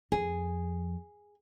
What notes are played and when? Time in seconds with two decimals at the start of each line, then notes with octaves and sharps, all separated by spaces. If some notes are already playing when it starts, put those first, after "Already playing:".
0.12 F2 G#4